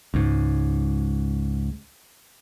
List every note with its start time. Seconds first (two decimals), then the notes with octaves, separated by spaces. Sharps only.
0.14 C#2 G#2